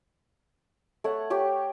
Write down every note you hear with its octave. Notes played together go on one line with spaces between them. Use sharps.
A3 C#5 F#5
G4 C#5 G5